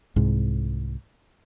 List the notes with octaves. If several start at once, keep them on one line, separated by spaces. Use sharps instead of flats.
C2 G#2